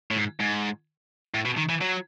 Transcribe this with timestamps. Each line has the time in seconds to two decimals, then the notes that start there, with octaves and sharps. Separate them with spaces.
0.11 A2
0.16 G#2
0.40 G#2
1.35 A2
1.46 B2
1.57 D#3
1.69 E3
1.81 F#3